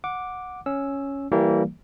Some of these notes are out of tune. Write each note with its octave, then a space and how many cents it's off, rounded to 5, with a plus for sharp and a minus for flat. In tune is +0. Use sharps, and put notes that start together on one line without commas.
F#5 -15 D6 +0
C#4 +0 E6 +0
E3 +0 G3 -15 A#3 -25